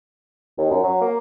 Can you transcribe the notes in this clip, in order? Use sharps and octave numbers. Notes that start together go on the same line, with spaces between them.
D#2
F#2
F#3
A#3